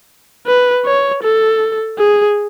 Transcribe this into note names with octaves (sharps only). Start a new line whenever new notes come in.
B4
C#5
A4
G#4